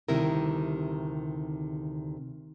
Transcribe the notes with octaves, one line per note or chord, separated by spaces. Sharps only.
D2 C3 D#3 G3 E4 A#4